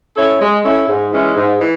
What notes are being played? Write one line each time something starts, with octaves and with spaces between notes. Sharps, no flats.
C#4 E4 A4 C#5
G#3
C#4 E4 A4 C#5
G#2
E3 G#3 C#4 E4
G#2
E3